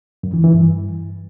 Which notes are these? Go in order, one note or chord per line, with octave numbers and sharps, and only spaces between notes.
F#2
E3
E3
G2